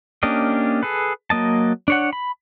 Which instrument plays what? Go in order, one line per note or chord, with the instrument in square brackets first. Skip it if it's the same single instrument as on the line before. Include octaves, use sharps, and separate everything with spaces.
[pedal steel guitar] A#3 C#4 D4 G4 D#5
G#4 A4 B4
F#3 A#3 D#5 A5
D4 C#5 F#5
B5